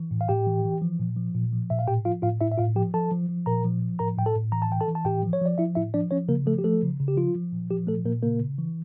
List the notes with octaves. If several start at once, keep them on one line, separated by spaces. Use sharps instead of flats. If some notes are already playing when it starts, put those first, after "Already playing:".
Already playing: E3
A2
F5
A2 G4 G5
E3
E3
F3
A#2
F3
A#2
F3
A#2 E5
F5
A2 G4 G5
F3 F4 F5
A2 F4 F5
A2 E4 E5
E5
A2 F4 F5
F3 G4 G5
F3 A4 A5
F3
F3
A#2 A#4 A#5
F3
F3
A2 A#4 A#5
A2 G5
A4 A5
A2
E3 A#5
A5
E3 G5
A4 A5
E3
A5
A2 G4 G5
F3
C#5
F3 D5
F3 E4 E5
A2 E4 E5
F3 D4 D5
F3 C#4 C#5
C#3 A#3 A#4
F3 A3 A4
G4
F3 A3 A4
C#3
C#3
G4
F3 F4
F3
A#2
F3 G4
A#2 A3 A4
A#2 A#3 A#4
C#3 A#3 A#4
C#3
E3